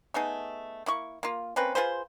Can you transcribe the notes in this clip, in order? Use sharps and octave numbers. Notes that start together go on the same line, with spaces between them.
A3 B3 D#4 G#4
A#3 E4 C#6
A#3 F4
A#3 C4 C#4 B4
F4 G#4 B4 C5